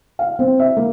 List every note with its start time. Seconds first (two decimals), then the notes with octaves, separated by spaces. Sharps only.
0.19 F5
0.39 C4
0.59 E5
0.77 A#3